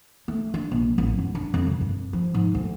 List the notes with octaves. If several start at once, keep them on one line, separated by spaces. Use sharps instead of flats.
A3
D4
A#1
A1
F#2
D4
F2
C#3
G2
F3
G#2
D2